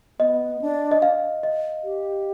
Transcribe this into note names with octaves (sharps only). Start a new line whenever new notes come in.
B3 D#5
D4
D#5
F5
D#5
G4